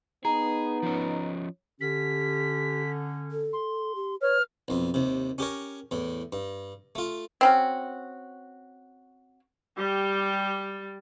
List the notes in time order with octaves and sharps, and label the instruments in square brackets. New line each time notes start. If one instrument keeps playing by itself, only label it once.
[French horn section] B3 D#4 [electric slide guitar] G#4 [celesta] A#5
[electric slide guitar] F3 C#4
[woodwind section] D3 C#4 [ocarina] G4 [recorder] B6
[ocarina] A4
[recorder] C6
[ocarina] G4
[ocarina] B4 [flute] C#5 [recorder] F6
[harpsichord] B1 F2
D#2 C3
C#4 G4 A#4 C#5
E2 A2
G2
A3 F4
[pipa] C4 C#4 F#4
[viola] G3 G4